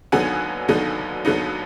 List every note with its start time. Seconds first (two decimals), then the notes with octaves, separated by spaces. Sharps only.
0.12 D#2 D3 F#3 B3 D#4 F#5 G#5
0.68 D#2 D3 F#3 B3 D#4
1.25 D#2 D3 F#3 B3 D#4